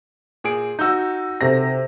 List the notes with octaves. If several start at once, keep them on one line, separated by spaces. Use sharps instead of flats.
A#2 G#4 D7
D#4 F#4 E6 G6
C3 A4 A#6